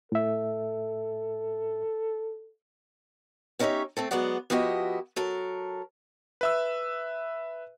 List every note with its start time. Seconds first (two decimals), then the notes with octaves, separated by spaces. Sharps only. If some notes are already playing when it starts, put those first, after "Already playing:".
0.12 A2 A4 E5
3.59 B3 C#4 D#4 G4 C#5 E5
3.97 A3 C4 A4
4.11 F#3 G#3 B3 D5 F#5
4.50 F3 B3 E4 F#4 G4 D#5
5.16 F#3 A4 A#4
6.41 B4 E5 E6